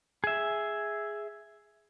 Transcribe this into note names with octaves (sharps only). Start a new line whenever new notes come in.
G#4 E5